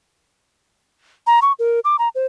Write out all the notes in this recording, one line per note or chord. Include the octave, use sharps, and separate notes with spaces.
A#5
C#6
A#4
D6
A#5
C5